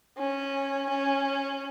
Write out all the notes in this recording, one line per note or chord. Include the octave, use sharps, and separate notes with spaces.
C#4
C#4